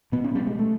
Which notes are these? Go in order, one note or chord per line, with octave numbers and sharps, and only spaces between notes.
B2 B3
C#4
G3
G#3
A3